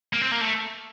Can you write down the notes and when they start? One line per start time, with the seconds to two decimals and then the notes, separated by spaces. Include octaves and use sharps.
0.13 A#3
0.21 C4
0.32 A#3
0.41 A3